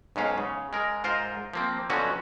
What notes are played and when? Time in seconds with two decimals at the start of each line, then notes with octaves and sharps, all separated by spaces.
0.16 B1 G#2 C#4 F5
0.38 C#3
0.73 G#3 A#4
1.04 G#2 F4 A#4 C5
1.53 F3 A#3 C4
1.90 B2 D3 F3 F#3 C#4 F#4